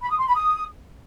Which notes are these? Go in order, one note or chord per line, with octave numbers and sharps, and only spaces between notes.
B5
D#6
C6
B5
D#6